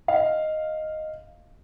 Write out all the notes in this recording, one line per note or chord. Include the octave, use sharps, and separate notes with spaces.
D#5 F5